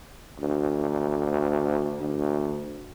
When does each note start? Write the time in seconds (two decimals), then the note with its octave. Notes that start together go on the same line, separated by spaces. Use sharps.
0.40 D2
2.01 D2